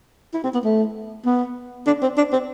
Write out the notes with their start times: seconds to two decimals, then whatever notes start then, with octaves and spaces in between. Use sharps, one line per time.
0.34 E4
0.44 C4
0.54 B3
0.65 A3
1.26 B3
1.87 D4
2.02 C4
2.17 D4
2.32 C4